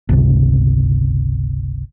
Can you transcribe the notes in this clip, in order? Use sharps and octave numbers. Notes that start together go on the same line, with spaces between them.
G1 C#2 C3